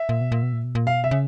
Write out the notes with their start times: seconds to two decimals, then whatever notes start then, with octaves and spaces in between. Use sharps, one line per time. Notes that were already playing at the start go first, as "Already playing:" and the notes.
Already playing: E5
0.09 A#2
0.21 B2
0.32 A#2
0.43 B2
0.53 A#2
0.64 B2
0.75 A#2
0.87 B2 F5
1.04 C3 E5
1.11 C#3